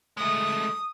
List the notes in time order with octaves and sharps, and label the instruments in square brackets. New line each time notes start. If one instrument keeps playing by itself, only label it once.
[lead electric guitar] G#3 A3 [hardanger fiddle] D#6